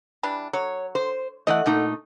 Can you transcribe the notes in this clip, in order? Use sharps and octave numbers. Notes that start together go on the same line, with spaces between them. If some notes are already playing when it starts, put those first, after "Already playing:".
E3 G3 D4
F#3 C#5
C5
E3 A3 D#5 F#5
A#2 A3 D#4